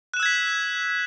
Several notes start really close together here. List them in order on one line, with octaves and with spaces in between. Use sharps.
F#6 E7 E6 G#6 B6